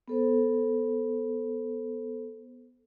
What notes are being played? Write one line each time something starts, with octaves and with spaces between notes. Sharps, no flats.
B3 A4 C5